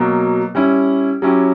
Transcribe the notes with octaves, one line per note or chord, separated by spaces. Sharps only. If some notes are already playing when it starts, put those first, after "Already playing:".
Already playing: B2 F#3 A#3
G3 C#4 E4
F#3 C#4 E4 G4